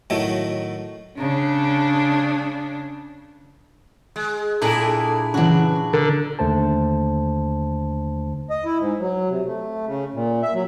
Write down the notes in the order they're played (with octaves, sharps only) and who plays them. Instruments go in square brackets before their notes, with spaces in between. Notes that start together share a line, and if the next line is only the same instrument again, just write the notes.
[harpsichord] A2 D#3 F#3 A3
[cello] C#3 D4
[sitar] G#3
[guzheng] A#2 D4 D#5 [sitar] E4 G#4 [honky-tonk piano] A4
[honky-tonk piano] C#3 E3 [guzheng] D4 F#4
[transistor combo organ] D3 [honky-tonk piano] A#4
[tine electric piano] D#2 D3 A3 C5 A5
[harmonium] D#5
E4
G#2
F#3
C3
A3
C#3
A#2
E5
F#3